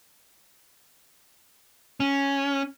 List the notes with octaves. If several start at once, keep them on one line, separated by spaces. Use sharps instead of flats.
C#4